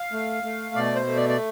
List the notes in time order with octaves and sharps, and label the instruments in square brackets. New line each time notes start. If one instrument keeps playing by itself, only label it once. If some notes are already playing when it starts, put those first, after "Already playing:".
Already playing: [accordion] F5
A3
A3
B2 D5
C5
A3
D5
D5